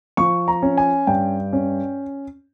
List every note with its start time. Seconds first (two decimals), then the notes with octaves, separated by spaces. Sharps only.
0.17 F3 C#6
0.48 A#5
0.62 C#4
0.78 G#5
1.07 G2 G5
1.53 C#4